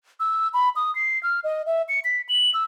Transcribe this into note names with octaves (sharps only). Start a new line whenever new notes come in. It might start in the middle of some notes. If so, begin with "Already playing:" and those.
E6
B5
D#6
C7
F6
D#5
E5
C#7
B6
F#7
E6